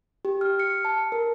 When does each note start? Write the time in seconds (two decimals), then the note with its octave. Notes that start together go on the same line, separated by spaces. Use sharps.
0.25 G4
0.41 F6
0.60 C#7
0.85 A5
1.12 A#4